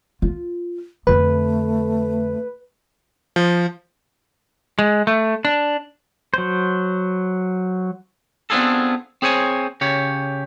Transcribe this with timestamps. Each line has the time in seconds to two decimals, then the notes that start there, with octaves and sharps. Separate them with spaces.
0.22 F4
1.07 F2 D3 A3 B4
3.36 F3
4.79 G#3
5.07 A3
5.45 D4
6.34 F#3 C5
8.50 B3 C4 D4 F4 G#4 A4
9.22 C4 G#4 C5 C#5 G#5
9.81 C#3 G4 C#5